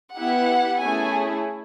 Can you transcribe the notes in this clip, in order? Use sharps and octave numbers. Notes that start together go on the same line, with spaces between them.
B3 E4 G4 F#5
A3 C#4 E4 G#4 G#5